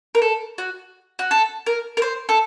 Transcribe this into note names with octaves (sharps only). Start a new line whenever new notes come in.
A#4
A4
F#4
F#4
A4
A#4
A#4
C5
A4